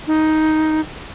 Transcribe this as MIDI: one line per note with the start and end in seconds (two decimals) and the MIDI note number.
0.07 0.81 63